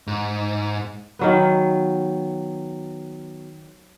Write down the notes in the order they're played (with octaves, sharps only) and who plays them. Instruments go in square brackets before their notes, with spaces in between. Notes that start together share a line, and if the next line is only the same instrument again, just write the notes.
[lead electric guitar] G#2
[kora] D#3 F#3 B3